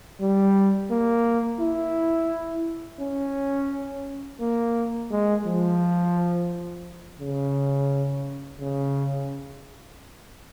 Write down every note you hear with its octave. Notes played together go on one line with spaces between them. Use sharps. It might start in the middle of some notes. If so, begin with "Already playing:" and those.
G3
A#3
E4
C#4
A#3
G#3
F3
C#3
C#3